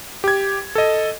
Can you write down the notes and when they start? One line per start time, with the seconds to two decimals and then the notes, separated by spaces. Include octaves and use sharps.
0.24 G4 G#6
0.75 A4 D#5